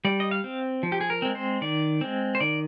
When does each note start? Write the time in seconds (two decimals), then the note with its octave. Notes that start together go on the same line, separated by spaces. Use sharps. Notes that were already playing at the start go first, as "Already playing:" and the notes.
0.05 G3 D5
0.20 D#5
0.31 F5
0.44 C4
0.83 F3
0.92 G4
1.01 G#4
1.10 A#4
1.22 G#3 C4
1.35 C5
1.61 D#3 D5
2.01 G#3 C4
2.35 C5
2.40 D#3 D5